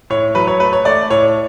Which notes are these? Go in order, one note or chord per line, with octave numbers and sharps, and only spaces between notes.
A2 C#5
F#3 B4
C#5
A3 B4
C#5
A3 D5
A2 C#5